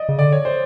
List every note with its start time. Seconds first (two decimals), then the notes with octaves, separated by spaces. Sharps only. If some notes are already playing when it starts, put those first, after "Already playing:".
Already playing: D5 D#5
0.09 C#3
0.19 D3 D5
0.32 C#5
0.45 C5